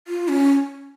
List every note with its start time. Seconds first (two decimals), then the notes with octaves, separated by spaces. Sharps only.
0.08 F4
0.28 C#4